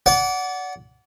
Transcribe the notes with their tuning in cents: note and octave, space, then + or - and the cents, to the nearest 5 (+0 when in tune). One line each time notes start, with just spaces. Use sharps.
D5 -30 F#5 +0